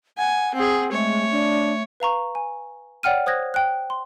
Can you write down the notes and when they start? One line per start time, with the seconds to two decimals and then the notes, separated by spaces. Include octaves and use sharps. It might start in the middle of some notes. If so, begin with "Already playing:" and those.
0.18 F#5 G#5
0.55 C4 G#4 F#5
0.92 G#3 A3 C#5 E5
1.32 D4
2.00 B4 F5 A#5 C#6
2.35 G#5
3.03 C#5 D5 F#5 G5 F6 D#7
3.26 C5 D#6 F#6 G#6 A#6
3.54 G5 F#6
3.90 C6